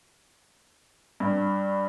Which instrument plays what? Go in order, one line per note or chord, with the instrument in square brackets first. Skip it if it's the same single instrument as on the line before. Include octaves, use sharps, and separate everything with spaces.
[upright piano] G2